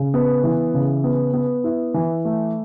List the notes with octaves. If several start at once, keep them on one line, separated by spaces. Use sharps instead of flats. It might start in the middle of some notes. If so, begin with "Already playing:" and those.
Already playing: C#3
B3
E3
C#3
B3
B3
E4
E3
A3